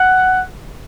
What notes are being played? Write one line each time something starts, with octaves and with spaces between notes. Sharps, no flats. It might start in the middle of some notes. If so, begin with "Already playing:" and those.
Already playing: F#5